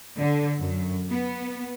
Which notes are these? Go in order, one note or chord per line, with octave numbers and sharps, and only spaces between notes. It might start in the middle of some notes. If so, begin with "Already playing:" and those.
D3
F#2
B3